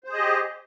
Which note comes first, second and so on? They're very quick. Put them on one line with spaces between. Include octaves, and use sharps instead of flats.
C5 G#4 D#5 G4